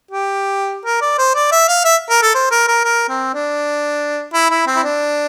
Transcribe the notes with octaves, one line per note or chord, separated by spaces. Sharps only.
G4
A#4
D5
C5
D5
E5
F5
E5
A#4
A4
C5
A#4
A#4
A#4
C4
D4
E4
E4
C4
E4
D4